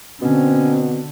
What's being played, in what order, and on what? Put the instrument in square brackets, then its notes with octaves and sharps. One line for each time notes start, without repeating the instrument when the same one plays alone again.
[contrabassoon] B2 [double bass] D3 [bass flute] C4 [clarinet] C#4